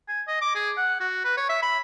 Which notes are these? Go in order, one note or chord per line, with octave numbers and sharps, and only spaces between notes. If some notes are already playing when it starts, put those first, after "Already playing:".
G#5
D#5
D6
G#4
F#5
F#4
B4
C#5
E5
B5